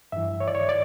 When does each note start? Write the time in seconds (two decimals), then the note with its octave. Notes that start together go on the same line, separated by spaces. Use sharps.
0.12 G2 E3 E5
0.40 C#5
0.48 D5
0.55 C#5
0.69 D5